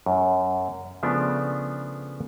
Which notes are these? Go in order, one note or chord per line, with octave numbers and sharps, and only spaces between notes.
F#2
C#3 F3 A3 B3 D4